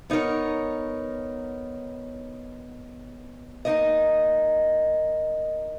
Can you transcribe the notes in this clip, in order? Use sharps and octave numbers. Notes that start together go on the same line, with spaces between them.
B3 D#4 A#4 C#5
A#3 D#4 A#4 D#5